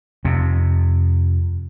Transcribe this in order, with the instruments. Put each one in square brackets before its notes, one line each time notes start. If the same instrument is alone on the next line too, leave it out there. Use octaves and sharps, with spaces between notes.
[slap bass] F2 C3